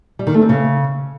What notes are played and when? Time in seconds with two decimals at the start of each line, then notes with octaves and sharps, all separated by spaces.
0.19 G3
0.27 D#3
0.34 A3
0.42 C4
0.49 C#3